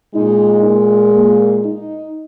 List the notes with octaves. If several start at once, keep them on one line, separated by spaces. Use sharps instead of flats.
A#2 G#3 D#4
A#3
A#3
D#4